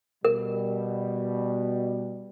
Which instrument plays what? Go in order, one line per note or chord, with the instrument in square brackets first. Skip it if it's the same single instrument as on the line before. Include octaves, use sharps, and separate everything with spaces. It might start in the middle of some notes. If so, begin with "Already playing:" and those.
[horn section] B2 G3 [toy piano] A#4